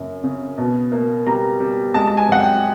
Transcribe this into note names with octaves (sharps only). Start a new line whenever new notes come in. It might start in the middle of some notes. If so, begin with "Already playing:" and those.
Already playing: F#2 C#3 A#3
C#3
B2
A#3
G3 A#5
G3
G#3 A5
A5
G#5
F#2 F#5
G5